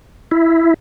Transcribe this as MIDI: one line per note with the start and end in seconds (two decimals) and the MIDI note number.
0.31 0.74 64